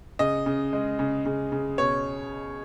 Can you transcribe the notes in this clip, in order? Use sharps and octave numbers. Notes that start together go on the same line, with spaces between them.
C#3 D#5
C#3
G#3
C#3
C#3
C#3
B2 C#5